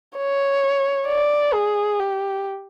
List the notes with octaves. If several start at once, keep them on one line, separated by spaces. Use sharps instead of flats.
C#5
D5
G#4
G4